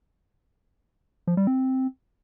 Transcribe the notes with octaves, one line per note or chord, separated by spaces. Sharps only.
F3
G3
C4